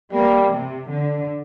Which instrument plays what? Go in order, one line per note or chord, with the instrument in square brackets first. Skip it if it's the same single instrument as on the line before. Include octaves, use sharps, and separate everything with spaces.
[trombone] G3 [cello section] A#3
[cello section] C3
D3